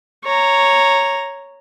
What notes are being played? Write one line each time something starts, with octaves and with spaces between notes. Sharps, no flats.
C#5 A#5